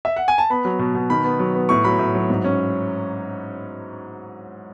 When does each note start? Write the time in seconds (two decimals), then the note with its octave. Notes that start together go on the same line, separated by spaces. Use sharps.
0.05 E5
0.16 F#5
0.28 G#5
0.38 A5
0.50 B3 B5
0.65 F#3
0.79 B2
0.95 B2
1.10 D#3 B5
1.25 B3
1.39 F#3
1.55 B3
1.69 A2 C#6
1.84 F#3 B5
1.99 A2
2.15 F#3
2.30 G#2
2.44 C#4